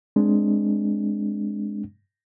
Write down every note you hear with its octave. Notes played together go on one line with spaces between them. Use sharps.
G#3 C4 D4